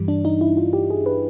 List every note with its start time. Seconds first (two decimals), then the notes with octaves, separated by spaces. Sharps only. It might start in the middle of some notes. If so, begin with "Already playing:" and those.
Already playing: G2 E3 G3
0.08 D4
0.25 D#4
0.41 E4
0.57 F4
0.73 G4
0.90 G#4
1.06 B4